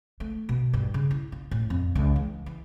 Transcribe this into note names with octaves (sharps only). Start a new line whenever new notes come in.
A3
B2
G2
C#3
E4
F4
A2
F2
C#2
E3
E3